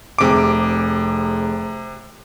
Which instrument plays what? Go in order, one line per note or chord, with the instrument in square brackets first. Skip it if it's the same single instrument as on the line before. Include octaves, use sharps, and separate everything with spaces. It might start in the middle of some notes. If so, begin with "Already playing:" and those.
[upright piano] F1 G#4 D7 [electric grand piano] C3 D6